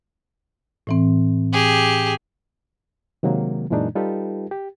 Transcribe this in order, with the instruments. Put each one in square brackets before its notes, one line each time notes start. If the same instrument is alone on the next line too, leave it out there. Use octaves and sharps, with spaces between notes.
[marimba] A2 E3 C4
[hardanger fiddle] G4 G#4
[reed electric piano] C3 D#3 F#3 G#3 A#3
F#2 A#2 E3 G#3 D4 D#4
G3 D#4 F4 G4 A4 B4
G4